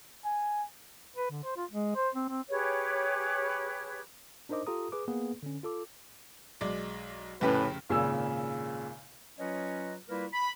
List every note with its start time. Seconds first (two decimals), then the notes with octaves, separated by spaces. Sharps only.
0.24 G#5
1.16 B4
1.31 D3
1.44 C5
1.57 F4
1.70 G#3
1.96 C5
2.14 C4
2.29 C4
2.49 G4 G#4 B4 C#5
4.49 D4 D#4 A#4 C5 D#5 D6
4.67 F4 G4 A4 A#5 D#6
4.92 G#4 B4 D6
5.08 A#3 B3 G#4 B4
5.43 D3 C#4
5.63 F4 A4 D6
6.61 B1 G#3 D5
7.41 F1 A2 C#3 C#4 G4 B4
7.89 G#1 A#2 C#3 G#5 E6
9.39 F#3 C#4 F4 B4 C#5 D#5
10.09 G3 A#3 E4 F4 A#4 B4
10.33 B5